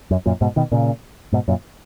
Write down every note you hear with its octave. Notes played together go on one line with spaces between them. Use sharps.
F#2
F#2 A#2
G#2 B2
B2 D#3
A#2 C#3
G#2 B2
F#2 A#2